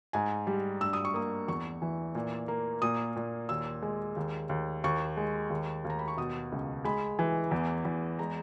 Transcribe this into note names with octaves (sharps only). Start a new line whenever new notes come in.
G#2 G#5
G3
G2 E6
D#6
C#6
A#3 D#6
E2 C#6
E3
A#2
A#3
A#2 D#6
A#2
D#2 E6
G#3
D#2
D#2
D#2 C#6
G#3
D#2
D#2
A#5
B5
C#6
B2 D#6
C#2
G#3 B5
E3
E2
E2
G#3 A#5